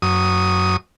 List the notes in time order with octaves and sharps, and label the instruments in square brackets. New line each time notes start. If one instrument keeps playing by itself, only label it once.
[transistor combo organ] F#2 D#6